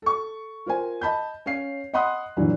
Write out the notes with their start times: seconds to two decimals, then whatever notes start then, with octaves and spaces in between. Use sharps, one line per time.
0.02 A4 C#6
0.66 F4 A#4 C5 G#5
1.01 D#5 A5 B5 G6
1.46 C#4 C#5 F5 C7
1.93 D#5 F#5 B5 C6 D#6 F#6
2.37 G2 A#2 D3 E3 F#3